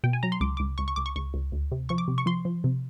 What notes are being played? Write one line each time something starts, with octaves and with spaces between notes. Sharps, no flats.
B2 G5
G#5
F#3 A#5
C6
C#2 D6
C#2 D6
C#2 C#6
C#6
C#2 D6
C#6
C#2 C#6
C#2
D2
C3
F3 C#6
D6
C3
C#6
F3 C6
F3
C3